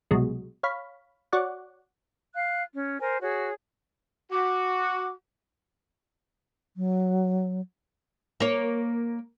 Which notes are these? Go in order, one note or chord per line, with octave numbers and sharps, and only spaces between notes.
C2 B2 F#3 G#3
C#5 F5 B5
F#4 C#5 D5 F#5
F5 F#6
C#4
A#4 C5 G#5
F#4 G#4 C#5
F#4 D6
F#3
A#3 C#5